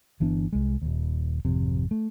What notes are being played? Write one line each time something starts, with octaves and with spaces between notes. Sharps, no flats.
G1 E3 B3 D4
C2 G#3
D#1 D#2
G#1 F2 C3
A3